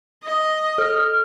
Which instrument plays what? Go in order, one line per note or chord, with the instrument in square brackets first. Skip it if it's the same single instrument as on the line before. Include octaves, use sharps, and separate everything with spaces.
[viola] D#5
[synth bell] A4 [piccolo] F6